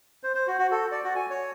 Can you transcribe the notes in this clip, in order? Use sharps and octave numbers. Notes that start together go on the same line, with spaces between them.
C5
C5
F#4
F#4
A4
D5
F#4
G#5
C#5